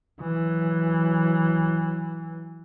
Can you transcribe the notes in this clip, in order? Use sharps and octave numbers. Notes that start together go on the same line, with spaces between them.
E3 F#3